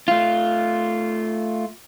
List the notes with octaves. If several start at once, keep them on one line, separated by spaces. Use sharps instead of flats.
A3 F4